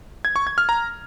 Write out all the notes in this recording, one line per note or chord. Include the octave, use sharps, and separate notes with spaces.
G#6
C#6
G#6
F6
A#5